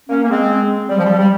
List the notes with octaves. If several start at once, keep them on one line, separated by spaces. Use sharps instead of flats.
A#3 C#4
A#3
G#3 C4
G3
F3
G3
G3